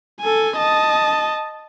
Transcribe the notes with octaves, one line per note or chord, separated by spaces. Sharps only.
A4 G#5
D#5 A5